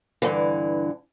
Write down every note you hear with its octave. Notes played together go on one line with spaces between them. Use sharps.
G2 D3 E3